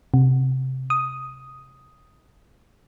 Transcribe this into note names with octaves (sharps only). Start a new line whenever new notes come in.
C3
D#6